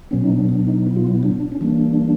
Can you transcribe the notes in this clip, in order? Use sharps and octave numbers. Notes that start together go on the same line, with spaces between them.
B2 F#3 B3 C#4
D#4
D4
D4
D#4
E4
F4
E4
D4
C#4
E3 G3 A#3 D4